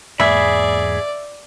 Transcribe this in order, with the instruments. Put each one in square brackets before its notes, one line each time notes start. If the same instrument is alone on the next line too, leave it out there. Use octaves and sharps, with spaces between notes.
[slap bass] E2 G#2 A#3 [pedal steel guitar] G#4 B5 [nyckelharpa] D5 [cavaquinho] E5